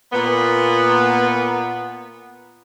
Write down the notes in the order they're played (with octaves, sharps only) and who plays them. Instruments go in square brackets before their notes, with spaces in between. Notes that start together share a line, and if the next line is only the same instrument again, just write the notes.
[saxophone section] A#2 B3